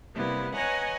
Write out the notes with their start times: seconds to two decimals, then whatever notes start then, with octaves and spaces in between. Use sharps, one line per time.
0.13 C3 G3 A#3 B3 E4
0.54 B4 C#5 D#5 F#5 G#5 A#5